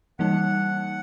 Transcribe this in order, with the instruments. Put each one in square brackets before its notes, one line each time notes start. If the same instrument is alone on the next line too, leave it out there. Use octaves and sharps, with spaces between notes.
[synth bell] E3 G3 A#3 D#4 [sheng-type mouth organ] F#5